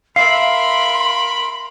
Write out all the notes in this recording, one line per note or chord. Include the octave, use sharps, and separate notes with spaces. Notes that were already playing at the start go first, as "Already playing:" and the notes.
A#4 E5 F5 B5 C6 C7